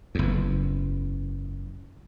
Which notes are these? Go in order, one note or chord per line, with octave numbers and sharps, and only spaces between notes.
F#1 E2